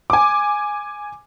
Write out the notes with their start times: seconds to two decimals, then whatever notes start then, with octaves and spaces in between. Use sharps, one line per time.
0.10 G#5 D6